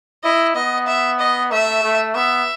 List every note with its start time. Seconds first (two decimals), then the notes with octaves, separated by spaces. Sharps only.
0.24 E4 D#5
0.56 B3 D#5
0.87 E5
1.20 D#5
1.51 A3 E5
1.83 A3
2.15 B3 E5